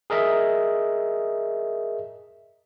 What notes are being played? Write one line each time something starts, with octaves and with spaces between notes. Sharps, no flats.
G#4 A#4 D#5 E5